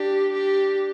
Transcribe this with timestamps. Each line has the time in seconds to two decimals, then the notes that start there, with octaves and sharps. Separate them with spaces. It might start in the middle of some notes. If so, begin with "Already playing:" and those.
Already playing: D4 G4
0.33 G4